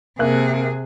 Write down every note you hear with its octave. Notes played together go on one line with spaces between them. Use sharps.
C3 A#3 G#4 E5 F#6